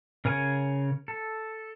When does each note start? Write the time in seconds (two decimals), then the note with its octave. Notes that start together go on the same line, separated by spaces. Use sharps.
0.25 C#3 A#4 C#5 G#5
1.08 A4